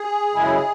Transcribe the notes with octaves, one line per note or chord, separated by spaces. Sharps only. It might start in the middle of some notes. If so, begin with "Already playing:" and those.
Already playing: G#4
F#2 C#3 G#3 E4